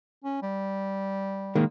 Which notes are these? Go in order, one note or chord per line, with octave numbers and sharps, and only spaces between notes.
C#4
G3
D#3 G#3 A#3